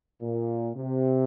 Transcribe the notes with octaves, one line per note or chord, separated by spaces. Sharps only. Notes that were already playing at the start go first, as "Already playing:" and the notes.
A#2
C3